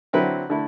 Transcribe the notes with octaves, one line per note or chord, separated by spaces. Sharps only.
D3 F#3 C4 E4 B4
D3 A3 E4